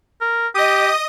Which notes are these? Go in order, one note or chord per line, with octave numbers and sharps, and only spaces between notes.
A#4
G4 D#5 D#6